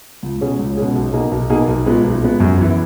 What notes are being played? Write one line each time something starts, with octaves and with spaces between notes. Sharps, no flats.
C#2
B2 G#3 C#4 G#4
C#2
B2 G#3 C#4 G#4
B1
B2 A#3 D#4 G#4
B1
B2 A#3 D#4 G#4
B1
A#2 G#3 B3
B1
A#2 G#3 B3
F#2
E3 B3